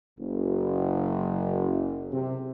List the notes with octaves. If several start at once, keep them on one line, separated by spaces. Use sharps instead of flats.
F#1
C3